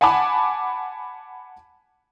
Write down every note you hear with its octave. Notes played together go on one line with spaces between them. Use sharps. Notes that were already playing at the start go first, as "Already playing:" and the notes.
F#5 G#5 A5 B5 D6